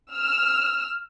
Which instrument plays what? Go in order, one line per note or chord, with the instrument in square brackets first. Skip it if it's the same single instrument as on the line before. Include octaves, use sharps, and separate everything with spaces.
[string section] E6 F6